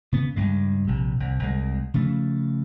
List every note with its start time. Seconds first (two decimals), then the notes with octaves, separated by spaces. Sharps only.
0.12 C#3 B3
0.36 C#2 G2 G#3
0.87 A#1 C3
1.20 C2
1.39 C2 G#3
1.94 C#3 F3 A3